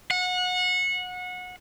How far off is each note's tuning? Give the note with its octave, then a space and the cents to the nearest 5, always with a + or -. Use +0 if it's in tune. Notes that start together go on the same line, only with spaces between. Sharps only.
F#5 -25